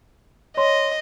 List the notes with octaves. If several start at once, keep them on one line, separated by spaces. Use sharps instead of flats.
C#5 D#5 C6